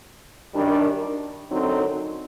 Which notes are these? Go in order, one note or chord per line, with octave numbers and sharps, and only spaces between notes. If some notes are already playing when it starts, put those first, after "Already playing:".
F#2 D#3 G3 D4
F#2 D3 F#3 C4 D#4